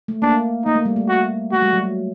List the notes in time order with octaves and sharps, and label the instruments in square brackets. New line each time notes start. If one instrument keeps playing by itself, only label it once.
[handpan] A3
[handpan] A#3 [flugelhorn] D4
[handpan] A#3 [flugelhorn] D#4
[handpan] A3
G3
A3
[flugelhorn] F#4
[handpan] A3 [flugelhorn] F#4
[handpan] G3
F#3
G3